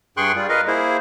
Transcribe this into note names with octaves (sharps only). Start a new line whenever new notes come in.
G2 G#4 G5 C6 C#6 F#6
G3 F4
A#4 B4 D#5 F5
A#3 E4 G#4 C5